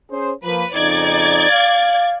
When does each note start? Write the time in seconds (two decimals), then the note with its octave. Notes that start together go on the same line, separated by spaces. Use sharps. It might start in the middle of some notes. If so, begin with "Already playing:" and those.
0.11 C#4 G#4 C5
0.44 F3 A#3 B4
0.74 F2 C#3 D#4 D5 G#6 A6
1.50 F5